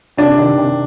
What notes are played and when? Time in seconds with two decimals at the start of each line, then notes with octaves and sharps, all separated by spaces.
0.17 C3 D4
0.38 D#3
0.58 C3